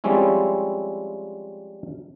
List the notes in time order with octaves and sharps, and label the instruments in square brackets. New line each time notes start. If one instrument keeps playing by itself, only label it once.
[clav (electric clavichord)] F3 G3 G#3 C4 C#4 E4